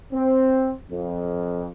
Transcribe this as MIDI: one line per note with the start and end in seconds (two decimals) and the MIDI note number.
0.13 0.71 60
0.90 1.67 41